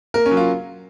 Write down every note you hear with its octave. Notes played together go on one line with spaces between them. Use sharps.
A#3 A#4
C#4
F#3
F4